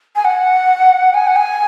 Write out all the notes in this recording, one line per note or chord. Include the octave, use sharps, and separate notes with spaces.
G#5
F#5
G#5
F#5
G#5